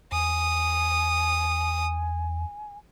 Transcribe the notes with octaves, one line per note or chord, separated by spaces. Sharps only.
E2 G#5 D#6